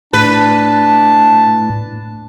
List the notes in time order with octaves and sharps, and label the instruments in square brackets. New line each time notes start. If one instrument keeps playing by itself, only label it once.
[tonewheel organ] A2 [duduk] D4 [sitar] B4 [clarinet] A5